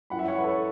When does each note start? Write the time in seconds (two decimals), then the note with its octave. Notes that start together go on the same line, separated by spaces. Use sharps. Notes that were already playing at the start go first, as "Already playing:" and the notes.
0.10 F#2 E3 F#5 B5
0.19 E5
0.28 C#5 F#5
0.38 B4
0.44 A4 C#5